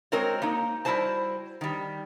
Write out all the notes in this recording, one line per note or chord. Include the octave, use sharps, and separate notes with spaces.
G#3 C4 F#4 A#4 C5 C#5
A#3 D#4
G3 E4 F#4 C5 A5
D#3 G3